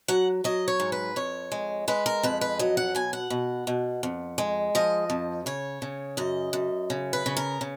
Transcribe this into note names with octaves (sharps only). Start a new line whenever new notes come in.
F#3 F#5
F#3 D#5
C#5
G#2
B4
F2 C#5
G#3
G#3 B4
A#4
F2 B4
B4
F#3 D#5
F#5
B2 G#5
F#5
B2
B2
F2
G#3
F3 D#5
F2
C#3 C#5
C#3
F#2 D#5
F#2
C#3
B4
C#3
A#4
C#3